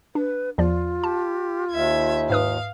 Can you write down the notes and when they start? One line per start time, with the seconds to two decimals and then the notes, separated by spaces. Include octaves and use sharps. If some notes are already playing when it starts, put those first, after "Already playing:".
0.15 D4 B4
0.58 E2 F3 F4 D5
1.04 G4 A5
1.71 D#2 E5 G#6
2.30 G#2 B4 F5 D#6